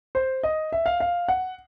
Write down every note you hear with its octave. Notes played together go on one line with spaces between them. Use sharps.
C5
D#5
E5
F5
F5
F#5